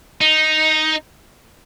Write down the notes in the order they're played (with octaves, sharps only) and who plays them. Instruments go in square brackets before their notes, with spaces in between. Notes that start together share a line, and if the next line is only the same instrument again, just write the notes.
[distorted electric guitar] D#4